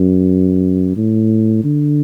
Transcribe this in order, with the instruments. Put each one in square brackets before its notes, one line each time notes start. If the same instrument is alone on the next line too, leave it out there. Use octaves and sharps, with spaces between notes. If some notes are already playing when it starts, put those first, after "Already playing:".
Already playing: [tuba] F#2
A2
D3